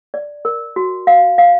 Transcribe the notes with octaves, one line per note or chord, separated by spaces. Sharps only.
D5
A#4
F#4
F5
F5